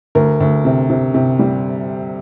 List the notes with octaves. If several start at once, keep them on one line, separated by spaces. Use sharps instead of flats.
D2 A#4
D2
C3
C3
C3
G3